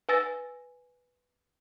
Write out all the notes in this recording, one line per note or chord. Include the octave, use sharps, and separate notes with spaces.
B4 G#5 E6 A6 A#6